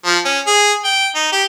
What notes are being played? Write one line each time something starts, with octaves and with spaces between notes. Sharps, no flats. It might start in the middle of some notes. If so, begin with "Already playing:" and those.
F3
C#4
G#4
G5
D#4
G4